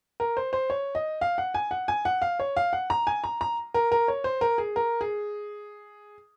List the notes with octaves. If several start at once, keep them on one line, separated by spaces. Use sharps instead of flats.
A#4
C5
C5
C#5
D#5
F5
F#5
G#5
F#5
G#5
F#5
F5
C#5
F5
F#5
A#5
G#5
A#5
A#5
A#4
A#4
C#5
C5
A#4
G#4
A#4
G#4